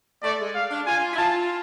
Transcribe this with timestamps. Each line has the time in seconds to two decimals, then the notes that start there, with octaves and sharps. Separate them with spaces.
0.23 A3 D5
0.39 G#3
0.55 F5
0.71 D4
0.86 F4 G#5
1.13 E4
1.18 F4 A5